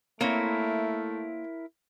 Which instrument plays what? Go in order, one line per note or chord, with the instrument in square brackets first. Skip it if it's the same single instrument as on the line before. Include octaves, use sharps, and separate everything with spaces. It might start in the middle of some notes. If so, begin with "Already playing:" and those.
[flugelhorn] A3 [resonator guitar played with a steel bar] A#3 C4 C#5 [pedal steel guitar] E4 A#4